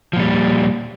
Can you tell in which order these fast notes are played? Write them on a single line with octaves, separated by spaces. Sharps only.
F3 A#2 G3